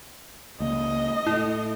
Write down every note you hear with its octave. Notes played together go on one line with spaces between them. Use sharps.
C#2 A#3 D#5
A2 E4